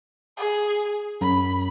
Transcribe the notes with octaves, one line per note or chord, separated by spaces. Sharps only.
G#4
F#2 B5